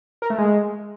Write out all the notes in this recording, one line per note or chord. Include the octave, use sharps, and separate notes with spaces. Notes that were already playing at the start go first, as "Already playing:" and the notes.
A#4
A3
G#3